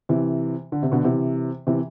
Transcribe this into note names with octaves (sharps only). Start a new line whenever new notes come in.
C3 E3
D3
C3
B2 D3
C3 E3
C3 E3